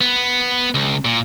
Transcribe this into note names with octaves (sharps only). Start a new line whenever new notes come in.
B3
C#2
A#2